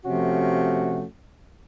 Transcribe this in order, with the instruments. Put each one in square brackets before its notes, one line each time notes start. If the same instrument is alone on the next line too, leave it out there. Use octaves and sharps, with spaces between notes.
[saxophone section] C3 F3 A3 C#4 F#4